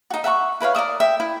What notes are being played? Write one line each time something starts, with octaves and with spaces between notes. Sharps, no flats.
D#4 F#4
E5 F#5 A5 C#6
E4 B4 C#5 F5
A#4 D5 E5 D#6
E5 G5
E4